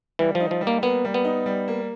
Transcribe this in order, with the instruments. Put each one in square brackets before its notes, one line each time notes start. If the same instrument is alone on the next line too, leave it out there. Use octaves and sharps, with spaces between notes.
[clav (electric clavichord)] E3 [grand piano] G3
[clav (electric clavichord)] F3
[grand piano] D#4
[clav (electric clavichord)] F3
[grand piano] G3
[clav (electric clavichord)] A#3
[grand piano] A#3 [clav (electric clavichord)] B3
[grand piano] G3
[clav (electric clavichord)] B3
[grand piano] D#4
G3
A#3